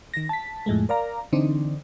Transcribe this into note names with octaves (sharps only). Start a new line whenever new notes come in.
D#3 A#6
A5 B6
F2 A2 G#3 A3
A#4 D5 F5 A#5
D3 E3 C4 D4 D#4